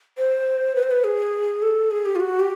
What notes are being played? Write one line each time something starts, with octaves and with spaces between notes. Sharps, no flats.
C5
B4
C5
B4
G#4
A4
G#4
G4
F4
F#4
G4